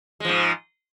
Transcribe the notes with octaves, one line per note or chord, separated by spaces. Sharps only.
G#2 F3 G#3